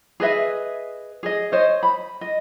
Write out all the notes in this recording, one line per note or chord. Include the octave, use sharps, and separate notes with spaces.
G#4 B4 D#5 E5
G#4 D#5
C5 C#5 D#5
B5
D#5